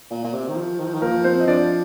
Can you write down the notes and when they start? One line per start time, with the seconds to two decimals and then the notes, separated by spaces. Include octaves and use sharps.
0.10 A#2
0.24 A#2
0.33 C3
0.48 D#3
0.56 F3
0.79 D#3
0.86 F3
0.94 D#3
1.01 F3 A#3 A#4
1.24 C4 C5
1.40 D#5
1.47 F3 D4 D5